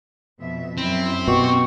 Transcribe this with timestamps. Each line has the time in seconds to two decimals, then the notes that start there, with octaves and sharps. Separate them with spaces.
0.40 F2 B2 E5
0.78 F#2 C4 E4
1.28 B2 G4 G5 C#6